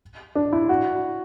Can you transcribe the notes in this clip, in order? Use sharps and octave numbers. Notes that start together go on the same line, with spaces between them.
D4
E4
F#4